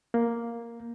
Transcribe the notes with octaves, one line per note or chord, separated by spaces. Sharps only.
A#3